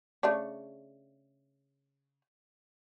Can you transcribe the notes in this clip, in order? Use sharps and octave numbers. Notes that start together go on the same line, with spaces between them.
C#3 A3 D4